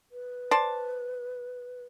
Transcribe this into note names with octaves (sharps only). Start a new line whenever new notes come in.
B4
C5 D5 A5